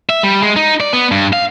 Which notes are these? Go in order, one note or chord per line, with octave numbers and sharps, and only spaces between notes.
E5
G3
G#3
D#4
D5
B3
G2
F5